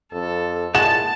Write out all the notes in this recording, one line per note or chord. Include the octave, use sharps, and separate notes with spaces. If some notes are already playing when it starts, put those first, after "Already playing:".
F2 A4
A#2 G#3 E4 F#4 A5 E7